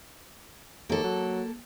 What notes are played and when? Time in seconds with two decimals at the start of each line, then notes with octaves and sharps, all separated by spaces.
0.89 D#2 A#3 A4
1.04 F#3